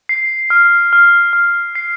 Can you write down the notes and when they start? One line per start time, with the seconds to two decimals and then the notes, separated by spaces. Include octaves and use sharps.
0.09 C7
0.50 F6
0.93 F6
1.33 F6
1.75 C7